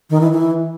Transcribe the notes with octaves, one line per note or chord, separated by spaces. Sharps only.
D#3
E3
E3